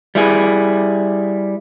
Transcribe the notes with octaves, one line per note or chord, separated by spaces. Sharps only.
G3 E4 G#4